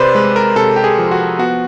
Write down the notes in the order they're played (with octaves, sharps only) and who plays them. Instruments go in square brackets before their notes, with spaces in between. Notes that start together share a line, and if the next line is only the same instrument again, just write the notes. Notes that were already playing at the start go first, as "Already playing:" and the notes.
Already playing: [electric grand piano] C3 B4 C5 D5
G#3 B4
A#4
C3 A4
G4
G#4
F3
F#4
B3 F#4